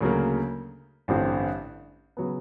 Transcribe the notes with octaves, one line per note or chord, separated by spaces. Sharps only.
D2 C#3 F#3 A#3
A1 G2 D3 G3 C4
C#3 F#3 B3